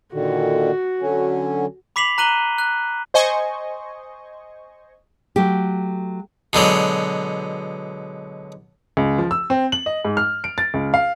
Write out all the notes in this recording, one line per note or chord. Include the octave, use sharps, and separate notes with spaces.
A#2 D3 D#3 F#4
D3 F#3 C#4
B5 D6 B6 C7 F7 F#7
A#5 F#6 D#7 F#7 G7
F#6
C5 D#5 G#5 C#6
F#3 A3 G4
B2 D3 F#3 G#3
C#2
F3
E6
C4
F#7
D#5
G#2
F6
D7
A6
C#2
F5